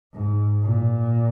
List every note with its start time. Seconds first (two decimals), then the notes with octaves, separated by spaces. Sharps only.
0.13 G#2
0.63 A#2